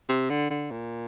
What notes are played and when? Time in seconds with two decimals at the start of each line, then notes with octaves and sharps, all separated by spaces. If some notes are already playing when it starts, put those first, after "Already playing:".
0.09 C3
0.30 D3
0.50 D3
0.71 A#2